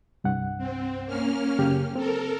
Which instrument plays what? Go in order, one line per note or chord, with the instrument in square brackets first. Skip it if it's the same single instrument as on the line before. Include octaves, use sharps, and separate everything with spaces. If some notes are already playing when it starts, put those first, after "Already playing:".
[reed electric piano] C2 G2 F#5
[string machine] C4
A#3 C#4 F6
[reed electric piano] F#2 C#3 G4
[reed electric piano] C4 [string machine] A4 A#4